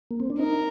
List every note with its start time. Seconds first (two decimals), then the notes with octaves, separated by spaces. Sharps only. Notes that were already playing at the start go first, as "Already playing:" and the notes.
0.11 A#3
0.20 C4
0.30 D4
0.40 D#4 A#4